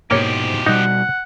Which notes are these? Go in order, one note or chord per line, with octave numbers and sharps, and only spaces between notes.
G#2 B2 F3 A#3 G4 C#5
B2 G3 D#4 F#5